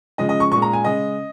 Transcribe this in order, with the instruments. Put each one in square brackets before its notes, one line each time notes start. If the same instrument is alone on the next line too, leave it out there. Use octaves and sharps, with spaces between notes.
[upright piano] C#3 F3 G#3 D#5
D#5
C#6
A#2 G#3 C#6
A#5
G#5
C#3 G#3 D#5